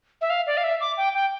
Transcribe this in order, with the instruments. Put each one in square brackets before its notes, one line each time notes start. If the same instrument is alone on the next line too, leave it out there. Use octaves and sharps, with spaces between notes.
[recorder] E5
F5
D5
F5
E5
D6
G5
G5